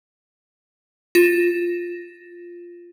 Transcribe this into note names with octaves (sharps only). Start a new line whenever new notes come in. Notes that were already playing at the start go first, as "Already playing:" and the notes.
F4 A#6 E7